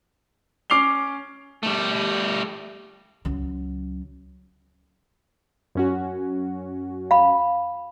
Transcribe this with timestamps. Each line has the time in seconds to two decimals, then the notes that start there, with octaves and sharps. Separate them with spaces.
0.70 C#4 D6 C7 F7 G7
1.63 G3 A3
3.25 C#2 F#3
5.75 F#2 C#4 F#4
7.11 F5 B5